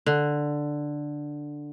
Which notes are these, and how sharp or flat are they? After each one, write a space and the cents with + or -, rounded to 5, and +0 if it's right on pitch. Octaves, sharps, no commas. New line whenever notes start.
D3 +5